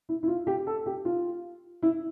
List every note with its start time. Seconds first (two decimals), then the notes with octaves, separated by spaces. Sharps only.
0.09 E4
0.23 E4
0.28 F4
0.47 G4
0.67 A4
0.86 G4
1.05 F4
1.83 E4